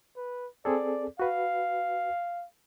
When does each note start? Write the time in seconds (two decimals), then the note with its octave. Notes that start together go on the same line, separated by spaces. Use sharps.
0.17 B4
0.65 C4 G#4 A4 D5
1.20 F#4 B4 F5